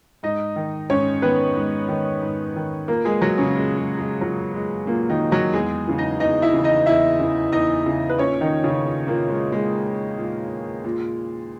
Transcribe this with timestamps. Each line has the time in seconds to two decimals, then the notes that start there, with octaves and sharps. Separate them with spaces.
0.23 G#2 D#4 D#5
0.56 D#3
0.90 G#2 C#4 C#5
1.22 D#3 B3 B4
1.56 G#2
1.88 D#3
2.22 G#2
2.56 D#3
2.88 A#2 A#3 A#4
3.05 G#3 G#4
3.21 F#3 F#4
3.38 C#3 C#4
3.54 A#2 G#3
3.76 G#3
3.99 G#3
4.21 A#2 F#3
4.54 G#3
4.87 A#2 A#3
5.09 D#3 D#4
5.31 F#3 F#4
5.53 E2 G#3 G#4
5.87 C#3 E3
5.98 D#4 D#5
6.20 E2 D#4 D#5
6.42 E4 E5
6.53 C#3 E3
6.64 D#4 D#5
6.86 E2 E4 E5
7.20 C#3 E3
7.52 E2 D#4 D#5
7.86 C#3 E3
8.10 B4
8.19 A#2 C#4 C#5
8.41 D#3 D#4
8.64 C#3 C#4
8.85 A#2
9.07 A#2 A#3
9.29 G#3
9.51 A#2 G#3
10.18 A#2
10.84 A#2